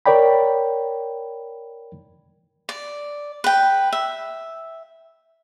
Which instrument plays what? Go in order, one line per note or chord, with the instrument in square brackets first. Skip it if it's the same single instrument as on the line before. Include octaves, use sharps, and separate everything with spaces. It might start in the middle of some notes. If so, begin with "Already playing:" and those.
[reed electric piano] A#4 C#5 D5 G5 B5
[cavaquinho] D5
B4 G5
E5